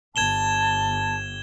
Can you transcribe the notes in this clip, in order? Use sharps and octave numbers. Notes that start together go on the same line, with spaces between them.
G1 A5 G#6 E7 G7